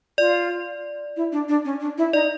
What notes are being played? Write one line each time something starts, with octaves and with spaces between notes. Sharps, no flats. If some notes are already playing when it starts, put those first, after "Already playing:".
F4 D5
E4
D4
D4
C#4
D4
E4
D#4 D5